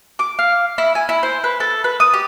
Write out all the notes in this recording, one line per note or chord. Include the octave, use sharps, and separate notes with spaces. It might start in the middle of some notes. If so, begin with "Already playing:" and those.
D6
F5
E4
G#5
E4
C5
B4
A4
B4
D#6
G4